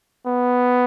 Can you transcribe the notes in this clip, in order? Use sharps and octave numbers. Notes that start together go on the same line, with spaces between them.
B3